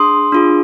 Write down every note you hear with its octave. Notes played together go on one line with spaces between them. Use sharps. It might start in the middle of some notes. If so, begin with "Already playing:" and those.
Already playing: D4 G#4 C6 D#6
D4 F4 G#4